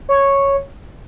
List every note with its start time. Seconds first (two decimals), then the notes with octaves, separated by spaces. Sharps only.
0.09 C#5